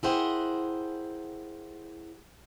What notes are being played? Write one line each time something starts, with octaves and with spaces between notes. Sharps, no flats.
E4 G4 G#4 A#4 C5 F#5